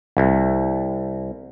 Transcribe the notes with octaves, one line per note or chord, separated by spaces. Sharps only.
C2